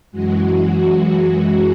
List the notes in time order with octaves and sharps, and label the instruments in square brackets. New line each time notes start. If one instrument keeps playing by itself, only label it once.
[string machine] F#2 E3 G#3 F#4